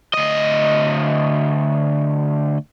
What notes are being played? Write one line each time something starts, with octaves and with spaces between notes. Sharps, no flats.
D2 D#5